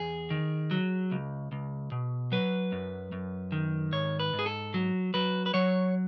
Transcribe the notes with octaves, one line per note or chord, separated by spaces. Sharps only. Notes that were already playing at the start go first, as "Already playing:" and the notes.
Already playing: E2 G#4
D#3
F#3
C#2
C#2
B2
F#3 B4
F#2
F#2
D#3
G#2 C#5
B4
G#2
G#4
A4
F#3
F#3 B4
B4
F#3 C#5